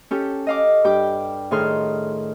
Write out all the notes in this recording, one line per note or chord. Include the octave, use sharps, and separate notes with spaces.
C#4 G4 A4
D#5 F5 D6
G2 G4 G5 D6
A2 D#3 G#4 A4 C6 F6